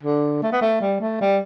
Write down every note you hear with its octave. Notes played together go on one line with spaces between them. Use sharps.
D3
A3
B3
A3
G3
A3
G3